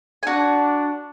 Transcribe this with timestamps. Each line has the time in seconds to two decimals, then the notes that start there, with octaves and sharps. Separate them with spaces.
0.23 G#5
0.27 D4 F#4 F#5